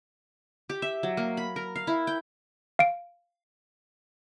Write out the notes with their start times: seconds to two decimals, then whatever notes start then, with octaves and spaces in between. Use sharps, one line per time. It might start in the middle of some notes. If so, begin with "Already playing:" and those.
0.70 G4
0.82 E5
1.03 F#3
1.17 A#3
1.37 B5
1.56 A#4
1.76 F5
1.87 E4
2.07 G5
2.79 F5 D7